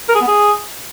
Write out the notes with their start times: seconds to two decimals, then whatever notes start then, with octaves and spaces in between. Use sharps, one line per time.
0.09 A#4
0.15 G#4
0.21 B3
0.27 G#4